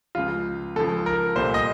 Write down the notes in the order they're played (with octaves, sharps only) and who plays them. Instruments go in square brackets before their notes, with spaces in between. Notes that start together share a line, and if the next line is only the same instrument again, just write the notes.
[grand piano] C#2 C#3 F3 F4
C#2 C#3 F3 A4
A#4
C2 A#2 A3 C5
D#5